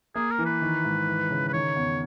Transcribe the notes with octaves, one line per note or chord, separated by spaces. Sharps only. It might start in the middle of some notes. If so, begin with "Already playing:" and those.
A#3 G#4
A#4
E3
B4
D#3
G#2
E3
C#3
B4
D#3 C#5
E2